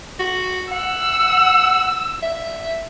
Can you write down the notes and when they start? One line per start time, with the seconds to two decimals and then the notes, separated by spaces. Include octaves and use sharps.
0.19 F#4
0.72 F#5 E6
2.23 E5